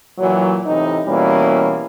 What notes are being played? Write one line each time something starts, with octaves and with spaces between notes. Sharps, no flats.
A#2 E3 F#3
A2 C3 E3 D#4
B2 E3 G3 A#3 C#4